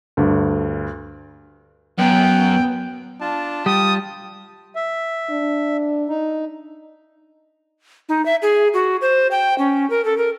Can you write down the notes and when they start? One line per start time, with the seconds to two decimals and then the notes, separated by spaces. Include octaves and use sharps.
0.17 D2 G2
1.98 F#2 B3 G5
3.21 D4 F4 A5
3.66 G3 G5 D#6
4.76 E5
5.30 D4
6.09 D#4
8.09 D#4
8.26 E5
8.42 G#4
8.74 F#4
9.02 C5
9.31 G5
9.58 C#4
9.90 A#4
10.05 A4
10.18 A#4